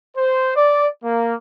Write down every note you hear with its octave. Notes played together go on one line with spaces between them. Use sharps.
C5
D5
A#3